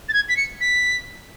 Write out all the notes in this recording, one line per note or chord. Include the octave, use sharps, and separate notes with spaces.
A6
G#6
B6
C#7
B6